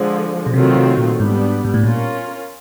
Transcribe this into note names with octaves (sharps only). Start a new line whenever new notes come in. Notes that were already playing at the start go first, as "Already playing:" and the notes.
Already playing: D3 F3 G#3
B2
C3 D#3 F#3 A3 C4 F4
C3
A#2
G#2 G3 B3 D4
G#2
A2
A#2 C#4 F4 A#4